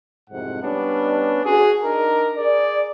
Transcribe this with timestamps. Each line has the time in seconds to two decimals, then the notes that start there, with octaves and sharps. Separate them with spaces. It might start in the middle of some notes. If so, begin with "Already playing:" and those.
0.30 C2 F2 G#2 C3 F#5
0.63 G3 B3 C#4 D4
1.45 F#4 G#4
1.83 D4 D#4 A#4
2.37 G#4 D5